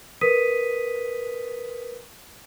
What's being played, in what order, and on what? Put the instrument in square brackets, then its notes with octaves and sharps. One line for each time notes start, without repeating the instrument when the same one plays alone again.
[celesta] A#4 B4 D#6 B6 D#7